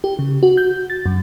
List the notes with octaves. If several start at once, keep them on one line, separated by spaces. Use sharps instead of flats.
G4
C#3
F#4
G6
A6
F#2